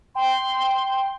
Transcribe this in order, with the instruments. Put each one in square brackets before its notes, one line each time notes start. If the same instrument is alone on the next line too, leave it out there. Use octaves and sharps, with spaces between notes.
[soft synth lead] G5 [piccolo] C6